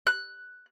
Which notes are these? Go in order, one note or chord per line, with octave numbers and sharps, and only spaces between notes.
F#6